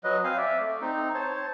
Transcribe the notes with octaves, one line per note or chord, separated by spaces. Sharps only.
F#3 B4 D#5
C4 F5 G#5
D5 E5
A3
C4 D#4
C5 C#5 A5